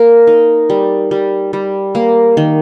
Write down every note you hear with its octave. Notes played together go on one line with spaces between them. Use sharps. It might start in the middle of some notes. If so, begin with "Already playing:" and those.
Already playing: A#3 A#4
D#4
G3
G3
G3
A#3
D#3